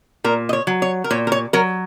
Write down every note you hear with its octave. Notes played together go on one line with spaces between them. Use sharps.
A#2 A#4
D#5
C#5
F#3
C#5
A#4
A#2 C#5
A#4
C#5
F#3 A#4